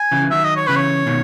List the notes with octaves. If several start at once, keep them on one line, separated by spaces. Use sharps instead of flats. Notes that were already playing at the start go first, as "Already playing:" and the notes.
Already playing: G#5
C#3 E3
E3
D#3 F#3 E5
D#5
C#5
C#3 E3 B4
C#5
B2 D#3